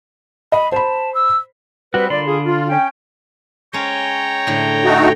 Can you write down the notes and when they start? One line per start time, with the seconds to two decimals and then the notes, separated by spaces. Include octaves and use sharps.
0.52 D#5 B5
0.72 C5 A5 B5
1.15 E6
1.94 G3 C4 F#4 B4
2.10 A#2 D3 G3 D5 B5 C6
2.26 F4 G#4
2.45 F4
2.68 C#4 G5
3.73 G#3 C#4 C#5 G5 A#5
4.47 A2 D3
4.85 A3 D#4 F#4